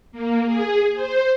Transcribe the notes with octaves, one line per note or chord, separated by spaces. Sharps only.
A#3
G#4
C5